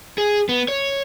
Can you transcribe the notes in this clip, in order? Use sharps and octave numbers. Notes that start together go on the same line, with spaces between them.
G#4
B3
C#5